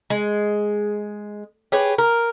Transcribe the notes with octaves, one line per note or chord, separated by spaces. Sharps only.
G#3
G4 G#4 B4 C#5
A#4